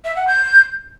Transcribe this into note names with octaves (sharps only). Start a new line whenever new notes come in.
E5
F#5
G6